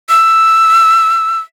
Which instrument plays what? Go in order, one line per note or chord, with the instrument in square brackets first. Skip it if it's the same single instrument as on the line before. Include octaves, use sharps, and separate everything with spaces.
[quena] E6